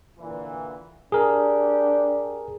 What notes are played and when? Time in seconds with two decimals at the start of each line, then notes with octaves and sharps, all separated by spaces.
0.18 A#2 D3 E3
1.12 D4 G4 G#4 A#4